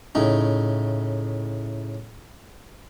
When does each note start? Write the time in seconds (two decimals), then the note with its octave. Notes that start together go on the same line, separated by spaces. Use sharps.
0.15 A2 C#3 D#4